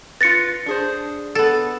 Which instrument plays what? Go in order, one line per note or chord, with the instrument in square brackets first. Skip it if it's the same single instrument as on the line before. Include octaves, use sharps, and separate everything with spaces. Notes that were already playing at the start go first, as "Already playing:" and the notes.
[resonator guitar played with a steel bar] F4 B4 [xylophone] A6 A#6 C#7
[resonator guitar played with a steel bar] D4 G#4 C5
[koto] B3 A4